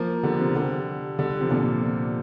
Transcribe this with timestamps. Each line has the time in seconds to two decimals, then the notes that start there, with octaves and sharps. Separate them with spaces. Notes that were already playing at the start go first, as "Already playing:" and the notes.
Already playing: F3 A#3
0.23 D3 G3
0.39 C3 F3
0.55 D3 G3
1.19 D3 G3
1.40 C3 F3
1.50 A#2 D3